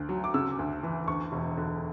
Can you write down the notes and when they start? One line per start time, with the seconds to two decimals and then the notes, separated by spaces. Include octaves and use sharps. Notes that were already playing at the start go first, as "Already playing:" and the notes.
Already playing: D2
0.09 F#3
0.24 D6
0.34 C#3 E6
0.59 D2
0.83 E3
1.07 D2 C#6
1.32 E1
1.57 D3